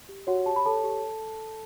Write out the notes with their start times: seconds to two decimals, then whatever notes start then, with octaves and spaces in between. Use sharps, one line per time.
0.09 G4
0.27 F#4 C#5 F#5
0.46 G4 A5
0.56 B5
0.65 A4 C#5 A5
0.84 G4